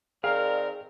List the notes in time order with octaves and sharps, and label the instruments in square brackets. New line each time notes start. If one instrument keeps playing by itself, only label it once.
[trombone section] D#3 C4 A#4 [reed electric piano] G#4 [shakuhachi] D5 [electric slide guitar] F5